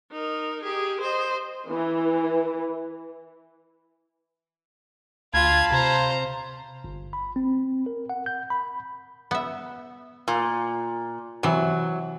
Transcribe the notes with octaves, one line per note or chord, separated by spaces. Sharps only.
D#4 A#4
G4 G#4
C5 D#5
E3
D2 F4 F5 A5 B5 G#6
C3 C5 A#5
G1
B5
C4
A#4
F#5
G6
B5
B3 E5
A#2
C3 E3 F#3